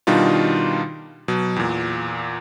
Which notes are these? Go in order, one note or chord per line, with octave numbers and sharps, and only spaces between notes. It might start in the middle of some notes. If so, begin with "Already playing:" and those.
B2 D#3 G3 D4 D#4 F4
B2 F#3
E2 A#2